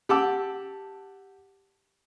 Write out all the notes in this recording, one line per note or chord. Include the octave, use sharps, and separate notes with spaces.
G4 F#5 A5 D6 E6